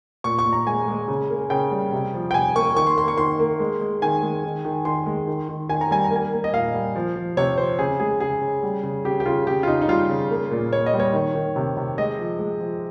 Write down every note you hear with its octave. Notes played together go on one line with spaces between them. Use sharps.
A#2 C#6
C#6
A#2
A#5
G#3 G#5
G#3
C#3
A#3
C#3 G5
G3
C3
F3
G5
C3 G#5
A#3 C#6
D#3 C#6
C6
A#3 C6
C#6
D#3 C6
A#3
G#3
G#3
D#3 G#5
G#3
D#3
D#3
D#3 C6
G#3
D#3
D#3
D#3 G#5
A#5
G3 G#5
A#5
A#3 G#5
A#3
D#5
A#2 F5
G3
F3
F3
C3 C#5
F3 C5
C#3 G#4
G#3 G#4
C#3 G#4
C#3
G3
C#3
C#3 G4
G4
C#3 F4
C#3 G4
F4
C#3 D#4
D#4
G3 F4
C#3
A#3
A#2
A#2 C#5
D#5
G3
C#5
D#3
D#3
C3
C3
G#3 D#5
F3
G#3
F3